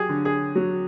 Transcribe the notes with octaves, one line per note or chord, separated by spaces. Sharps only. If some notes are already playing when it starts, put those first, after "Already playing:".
Already playing: F#3 G4 G#4
D3
G#4
F#3